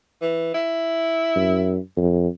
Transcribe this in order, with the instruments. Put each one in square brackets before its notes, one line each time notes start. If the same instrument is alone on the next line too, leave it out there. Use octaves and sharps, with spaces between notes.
[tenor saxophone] E3
E4
[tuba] F#2
F2